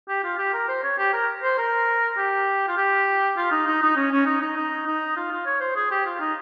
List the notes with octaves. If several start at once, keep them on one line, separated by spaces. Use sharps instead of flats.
G4
F4
G4
A#4
C5
C#5
G4
A#4
C5
A#4
G4
F4
G4
F4
D#4
D#4
D#4
C#4
C#4
D#4
D#4
D#4
D#4
F4
F4
C#5
C5
G#4
G4
F4
D#4